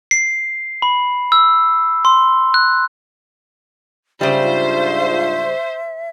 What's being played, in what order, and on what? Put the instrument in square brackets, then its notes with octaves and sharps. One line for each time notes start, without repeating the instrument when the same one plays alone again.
[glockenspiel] C7
B5
E6
C6
F#6
[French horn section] G#2 D4 F4 [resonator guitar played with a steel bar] C#3 G3 [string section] C5 [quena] E5